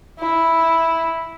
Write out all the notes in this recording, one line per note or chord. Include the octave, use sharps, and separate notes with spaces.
E4